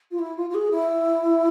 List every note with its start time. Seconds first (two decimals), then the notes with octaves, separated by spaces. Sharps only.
0.11 F4
0.18 E4
0.36 F4
0.49 F4
0.54 G#4
0.70 E4